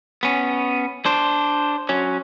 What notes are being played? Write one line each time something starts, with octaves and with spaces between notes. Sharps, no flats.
B3 C#4
D4 C5
F#3 C#4